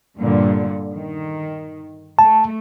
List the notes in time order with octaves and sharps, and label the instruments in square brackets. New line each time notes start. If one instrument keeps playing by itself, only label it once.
[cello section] G2 A#2 D3
D#3
[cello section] A3 [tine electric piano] A5